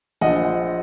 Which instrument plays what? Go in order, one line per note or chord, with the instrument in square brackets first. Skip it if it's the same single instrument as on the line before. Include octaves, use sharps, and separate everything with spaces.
[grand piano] A#1 A#2 F3 D#5 F#5